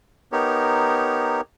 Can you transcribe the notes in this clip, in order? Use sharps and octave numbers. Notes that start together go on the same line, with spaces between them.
B3 D#4 G4 A#4 C#5